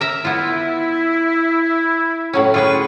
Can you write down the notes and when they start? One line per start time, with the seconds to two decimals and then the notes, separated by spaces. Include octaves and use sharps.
0.01 A#4 E5 A#5
0.25 B3 E4 F4
2.33 A2 F#3 C#4
2.54 F4 G#4 B4 G5 B5 C#6